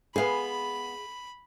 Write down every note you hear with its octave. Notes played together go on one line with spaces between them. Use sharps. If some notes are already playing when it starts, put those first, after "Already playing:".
G#3 B3 G#4 F5 B5